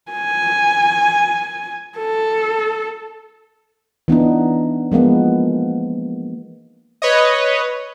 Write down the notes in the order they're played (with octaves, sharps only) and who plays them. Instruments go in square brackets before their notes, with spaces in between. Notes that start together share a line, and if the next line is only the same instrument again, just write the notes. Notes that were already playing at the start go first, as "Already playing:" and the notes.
[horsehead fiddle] G#5
A4
[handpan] E3 B3 D4 D#4
F3 G#3 A#3 B3
[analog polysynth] B4 C#5 D#5